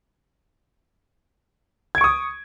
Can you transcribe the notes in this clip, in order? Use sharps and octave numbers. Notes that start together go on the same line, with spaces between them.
C#6 D#6 G#6 D7